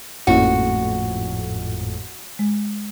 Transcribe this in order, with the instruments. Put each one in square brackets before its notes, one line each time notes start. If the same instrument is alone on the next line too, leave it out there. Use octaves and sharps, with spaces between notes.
[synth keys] G#1 F2 A2 [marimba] A#3 C#4 E4 [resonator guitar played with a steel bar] F#4
[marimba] G#3